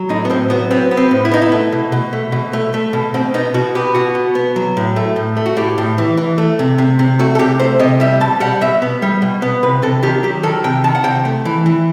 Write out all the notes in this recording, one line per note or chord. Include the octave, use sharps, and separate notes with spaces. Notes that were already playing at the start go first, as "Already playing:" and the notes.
Already playing: F#3
A2 D#4
B3
A2 C4
F#3 B3
B3 C4
B3
C4
A2
E4
B3 D#4
E4
A3
B2
B2
A3
B2
A3
A3
B2
B2 C4
B3 D#4
B2 F#4
B3 G4
B2 F#4
B2
B3
F#3
A2
A3
A2
A3
F#4
A2 G4
A2
E3
E3
A3
C3
C3
C3
A3 F#4
A4
C3 G4
A3 C5
C3 D#5
G3 E5
B2 A5
G3 F#5
B2 E5
B3
G3
B2
B3
C3 B4
C3 A4
D#3 G4
F#3 G4
D#3 A4
C3 G5
D#3 A5
F#5
C3 G5
A3
E3
E3